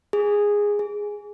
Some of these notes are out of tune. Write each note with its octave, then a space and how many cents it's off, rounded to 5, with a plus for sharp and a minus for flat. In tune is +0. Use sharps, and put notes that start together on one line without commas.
G#4 -10
G#4 +0